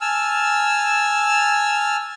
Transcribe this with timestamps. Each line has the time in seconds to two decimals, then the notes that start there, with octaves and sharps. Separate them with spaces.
0.01 G#5 A5 E6 F6